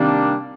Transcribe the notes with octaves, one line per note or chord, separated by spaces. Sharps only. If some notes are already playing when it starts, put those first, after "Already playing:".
Already playing: C3 D#3 G3 A#3 D4